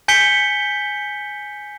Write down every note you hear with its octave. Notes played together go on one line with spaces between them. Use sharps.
G#5 G6 B6 C#7 G7